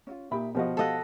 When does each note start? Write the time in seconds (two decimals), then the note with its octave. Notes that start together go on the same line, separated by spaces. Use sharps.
0.07 C#4 E4 F4
0.31 A#2 D#4 G4 E5 B5
0.55 B2 F3 F#4 G4 D#5
0.77 G4 A4 D#5 F5 F#5